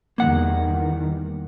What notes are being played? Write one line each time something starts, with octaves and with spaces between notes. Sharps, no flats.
E2 D#3 G3 A#3 F#5